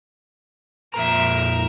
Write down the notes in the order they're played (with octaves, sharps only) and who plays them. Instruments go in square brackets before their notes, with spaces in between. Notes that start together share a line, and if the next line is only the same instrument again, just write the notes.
[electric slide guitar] F2 A#2 A#5 [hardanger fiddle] A#4 E5